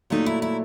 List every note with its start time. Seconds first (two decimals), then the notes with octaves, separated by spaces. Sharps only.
0.10 A#2 F#3 A3 D#4
0.26 E4
0.42 E4